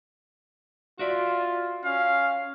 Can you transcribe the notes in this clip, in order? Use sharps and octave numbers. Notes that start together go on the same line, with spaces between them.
F4 F#4 D5 E5
C#4 F5